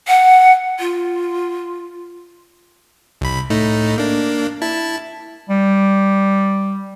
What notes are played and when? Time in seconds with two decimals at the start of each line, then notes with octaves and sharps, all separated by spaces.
0.08 F#5
0.79 F4
3.21 C2 B5
3.50 A2 A3 D#4
3.98 A#3 D4
4.62 E4 A5
5.49 G3